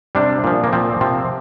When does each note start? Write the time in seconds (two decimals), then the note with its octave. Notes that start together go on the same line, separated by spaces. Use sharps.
0.15 C3 G3 D4
0.44 A#2 F3
0.64 A#3
0.73 A#2 F3 C4
1.01 C3 F3 C4